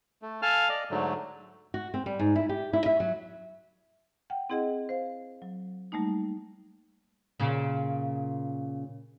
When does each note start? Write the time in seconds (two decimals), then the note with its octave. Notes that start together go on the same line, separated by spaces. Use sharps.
0.22 A3
0.42 A4 F5 G#5 A5 F6
0.69 D5 D#5
0.90 G#2 D3 F#3 A3
1.74 F#4
1.94 C4
2.06 G3
2.19 G#2
2.36 E4
2.49 G4
2.73 E4
2.86 E5
3.00 F#3
4.30 F#5 G5
4.50 C4 E4 G#4 D#5 F#5
4.89 C5 F5
5.42 F#3
5.92 G3 A3 A#3 D#4
7.40 A#2 C#3